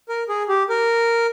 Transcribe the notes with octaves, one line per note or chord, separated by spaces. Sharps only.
A#4
G#4
G4
A#4